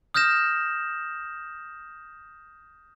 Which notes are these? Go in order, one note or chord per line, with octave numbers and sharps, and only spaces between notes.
D#6 F6 G6 A#6 E7